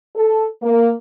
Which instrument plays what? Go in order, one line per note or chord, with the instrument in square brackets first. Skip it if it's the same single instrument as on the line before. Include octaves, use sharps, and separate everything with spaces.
[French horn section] A4
A#3